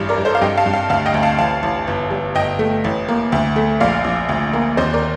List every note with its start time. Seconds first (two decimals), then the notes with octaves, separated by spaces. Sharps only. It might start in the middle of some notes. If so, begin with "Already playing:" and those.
Already playing: A1 G2
0.09 A#4 D5
0.18 G2
0.25 A4 C5
0.35 F5
0.41 G2 D#5 G5
0.57 F5 A5
0.66 G2
0.73 F5 A5
0.90 D2 F5 A5
1.06 D#5 G5
1.14 D2
1.23 F5 A5
1.38 A1 F5 A5
1.63 A1
1.88 G1
2.11 G3
2.35 G1 D#5 G5
2.59 A3
2.84 A1
3.08 A#3
3.32 D2
3.56 A3
3.80 A#1 D5 F5
4.04 A#1
4.29 D2
4.53 A#3
4.77 D#2 C5 D#5
4.93 A#4 D5